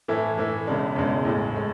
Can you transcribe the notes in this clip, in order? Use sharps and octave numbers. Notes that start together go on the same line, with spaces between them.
A2 E3 A3 E4
A2 E3 A3 E4
E1 E2 C#3 G#3 D4
E1 E2 C#3 G#3 D4
A1 A2 G#3
A2 G#3